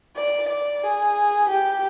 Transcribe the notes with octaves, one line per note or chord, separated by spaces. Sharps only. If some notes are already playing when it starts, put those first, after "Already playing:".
D5
D5
G#4
G4